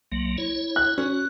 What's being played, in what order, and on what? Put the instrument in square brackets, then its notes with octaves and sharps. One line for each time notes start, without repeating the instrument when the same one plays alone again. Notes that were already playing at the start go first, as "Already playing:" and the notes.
[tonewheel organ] C2 F#3 A#3
E4 C#5
[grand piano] F#6
[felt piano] C#4 [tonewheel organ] F#4